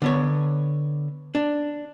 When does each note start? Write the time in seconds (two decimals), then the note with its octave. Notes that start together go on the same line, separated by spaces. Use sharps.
0.02 D3 B3 C#5
1.35 D4